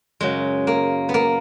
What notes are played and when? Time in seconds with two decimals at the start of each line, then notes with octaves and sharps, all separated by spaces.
0.21 F#2 C#3 F#3 G#3
0.67 A#3
1.09 B3
1.14 A#3